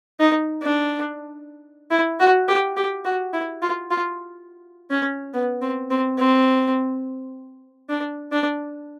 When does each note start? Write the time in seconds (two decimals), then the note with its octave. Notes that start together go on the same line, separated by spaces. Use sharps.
0.20 D#4
0.62 D4
1.91 E4
2.20 F#4
2.48 G4
2.77 G4
3.05 F#4
3.33 E4
3.62 F4
3.91 F4
4.90 C#4
5.34 B3
5.62 C4
5.90 C4
6.18 C4
7.89 D4
8.32 D4